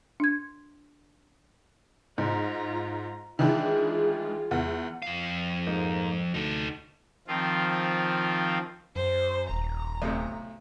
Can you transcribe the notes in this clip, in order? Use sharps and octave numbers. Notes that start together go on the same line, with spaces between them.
D4 G#6
G#2 F4 A#5
D#3 E3 G#3 D4 F4 G#4
E2
F2 F5
G#2 A#3 D#4
D2 D#4 A4
D#3 F3 C4 F4
F#2 C5
D#1 A#5
B1 A2 C3